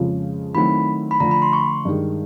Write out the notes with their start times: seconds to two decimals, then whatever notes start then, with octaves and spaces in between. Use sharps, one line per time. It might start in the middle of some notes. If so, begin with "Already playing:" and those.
Already playing: F2 C#3 F3 G#3
0.55 D#3 F#3 A3 C4 E4 B5
1.11 B5
1.20 D3 F3 A3 A#5
1.31 B5
1.42 C6
1.53 C#6
1.85 G2 D#3 G#3